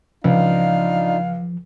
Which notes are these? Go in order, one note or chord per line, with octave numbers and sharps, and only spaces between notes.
C#2 F3 D4 D#4 F4 F5